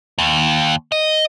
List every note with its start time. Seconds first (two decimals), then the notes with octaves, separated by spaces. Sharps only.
0.18 D#2
0.92 D#5